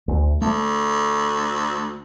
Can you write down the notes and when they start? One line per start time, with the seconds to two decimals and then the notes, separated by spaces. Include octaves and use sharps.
0.08 D2
0.41 D2 A3